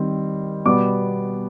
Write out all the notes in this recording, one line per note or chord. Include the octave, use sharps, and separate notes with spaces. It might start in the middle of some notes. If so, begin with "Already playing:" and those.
Already playing: D#3 G3 C4
B2 G3 B3 D6